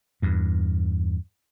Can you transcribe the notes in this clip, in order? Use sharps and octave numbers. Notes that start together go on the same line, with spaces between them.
E2 G2